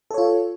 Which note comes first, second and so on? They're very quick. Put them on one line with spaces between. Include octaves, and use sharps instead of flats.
A4 C#5 F4